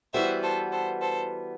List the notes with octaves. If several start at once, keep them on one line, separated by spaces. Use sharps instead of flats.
E3 G3 B3 F#4 C5 E5
A4 C5
A4 C5
A4 C5